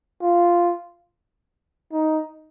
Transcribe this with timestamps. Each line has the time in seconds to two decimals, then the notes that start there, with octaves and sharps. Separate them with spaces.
0.22 F4
1.92 D#4